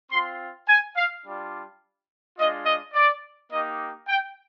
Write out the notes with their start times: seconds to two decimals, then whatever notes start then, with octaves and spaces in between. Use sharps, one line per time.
0.11 C4 F4 C6
0.67 G#5
0.96 F5
1.25 G3 D4 F4
2.37 G#3 D4 F4 D#5
2.66 D#5
2.94 D5
3.51 A#3 D#4 G4 D#5
4.08 G5